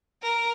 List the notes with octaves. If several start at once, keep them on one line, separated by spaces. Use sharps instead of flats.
A#4